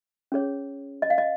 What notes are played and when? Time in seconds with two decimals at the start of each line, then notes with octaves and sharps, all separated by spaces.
0.32 C#4 G#4 C#5
1.02 D#5
1.10 F5
1.18 D#5